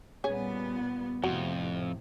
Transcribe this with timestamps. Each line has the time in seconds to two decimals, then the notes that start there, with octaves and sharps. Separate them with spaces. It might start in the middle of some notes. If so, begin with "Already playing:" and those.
0.24 A#2 G3 B3 C#4 G#4 G#5
1.24 F2 A2 C3 F#4